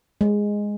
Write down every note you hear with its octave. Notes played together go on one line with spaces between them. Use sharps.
G#3